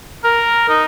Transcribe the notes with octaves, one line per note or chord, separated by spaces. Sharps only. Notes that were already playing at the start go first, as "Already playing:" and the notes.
A#4
D#4